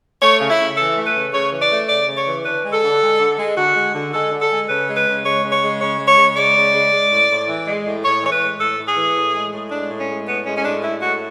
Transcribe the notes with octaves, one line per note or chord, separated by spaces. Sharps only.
A3 C#5
C#3
E4
C#3
E3 A4
A3
B4
C#3
C#3 C#5
E3
D5
A3
C#3 D5
C#3
C#5
E3
D3 B4
G#3
A4
D3
G#3
D3
G#3
D3 F#4
G#3
D3
G#3 A4
D3
A4
G#3
C#3 B4
G#3
B4
C#3
G#3 C#5
C#3
C#5
G#3
C#3 C#5
G#3
C#5
C#3
G#3 D5
C#3
G#3
G#3
A2
A2
E3
G#3
A2
A2 C#5
E3 C#5
B4
G#3
A2 A4
A2
G#4
E3
A2
G#3
A2
G#3 D4
A2
C#4
G#3
A2 B3
G#3 C#4
C#4
A2 D4
G#3 E4
A2 F#4